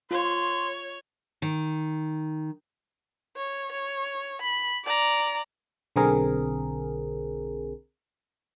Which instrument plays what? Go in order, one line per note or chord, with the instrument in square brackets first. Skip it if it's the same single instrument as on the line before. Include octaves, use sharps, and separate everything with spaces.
[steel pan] F4 [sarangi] C#5 [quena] C6
[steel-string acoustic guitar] D#3
[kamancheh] C#5
C#5
B5
D5 A#5
[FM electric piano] B1 D3 C4 G#4 A#4